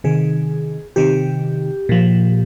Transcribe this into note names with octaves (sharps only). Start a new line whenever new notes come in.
C3 D#3 G#4
C3 D#3 G4
A#2 F3